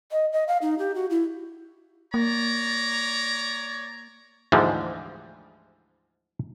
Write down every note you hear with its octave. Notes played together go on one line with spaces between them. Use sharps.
D#5
D#5
F5
D#4
G4
F#4
E4
A#3 C#5 D5 A#5
D2 G#2 E3 F3 G3 G#3